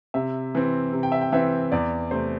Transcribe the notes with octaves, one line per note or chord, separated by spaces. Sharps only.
C3 E5
E3 C4
C3
G5
E5
G5
E3 C4 E5
E2 D5
C3 A3 C5